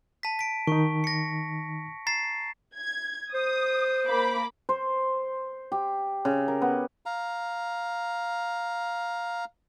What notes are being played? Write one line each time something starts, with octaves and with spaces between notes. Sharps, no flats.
A5 B6
B6 D7
D#3 D#4 C#6
A#6 C#7
A#5 A6 C7
G#6
C5 D#6
A#3 B5 D6
C5
G4
C#3
A#4
B3
F5 A#5